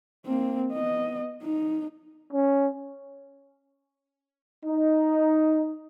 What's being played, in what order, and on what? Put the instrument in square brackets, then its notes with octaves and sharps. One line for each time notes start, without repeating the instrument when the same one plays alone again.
[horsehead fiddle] A#3 C4
B3 D#5
D#4
[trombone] C#4
[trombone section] D#4